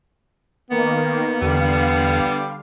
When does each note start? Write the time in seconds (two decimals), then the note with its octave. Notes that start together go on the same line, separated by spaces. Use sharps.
0.70 D#3 A#3 B3
1.42 E2 D3 G3 F5